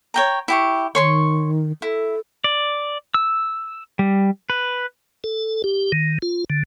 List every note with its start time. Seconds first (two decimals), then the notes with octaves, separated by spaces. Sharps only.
0.14 C#5 G5 A#5
0.48 E4 G4 C#6
0.95 D#3 C#5 C6 C#6
1.82 E4 A4
2.44 D5
3.14 E6
3.99 G3
4.50 B4
5.24 A4
5.64 G4
5.92 D#3
6.22 F4
6.50 D3